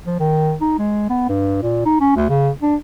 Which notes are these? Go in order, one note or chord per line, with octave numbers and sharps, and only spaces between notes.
F3
D#3
D#4
G#3
B3
G2
A#2
D#4
C#4
D2
C#3
D4